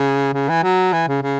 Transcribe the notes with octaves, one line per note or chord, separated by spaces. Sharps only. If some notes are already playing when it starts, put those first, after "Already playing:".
Already playing: C#3
C#3
E3
F#3
E3
C#3
C#3